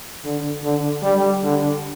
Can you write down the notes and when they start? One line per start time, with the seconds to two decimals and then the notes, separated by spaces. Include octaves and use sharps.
0.24 D3
0.63 D3
1.03 G3
1.43 D3